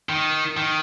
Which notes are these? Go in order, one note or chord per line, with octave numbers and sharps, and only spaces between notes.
D#3
D#3